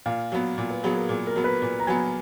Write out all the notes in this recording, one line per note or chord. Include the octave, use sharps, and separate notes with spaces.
A#2 F5
F#3 B3
A#2
B4
F#3 B3 G#4
A#4
A#2 G#4
A#4
F#3 B3
B4
A#2
A#5
F#3 B3 G#5